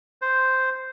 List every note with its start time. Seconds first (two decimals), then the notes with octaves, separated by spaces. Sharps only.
0.22 C5